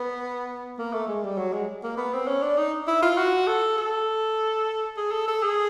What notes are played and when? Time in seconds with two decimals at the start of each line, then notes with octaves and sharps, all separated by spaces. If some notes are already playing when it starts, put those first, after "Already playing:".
Already playing: B3
0.79 A#3
0.93 A3
1.08 G#3
1.24 G3
1.38 F#3
1.53 G#3
1.84 A#3
1.97 B3
2.14 C4
2.28 C#4
2.42 D4
2.58 D#4
2.88 E4
3.02 F4
3.18 F#4
3.47 A4
3.78 A4
4.97 G#4
5.12 A4
5.28 A4
5.43 G#4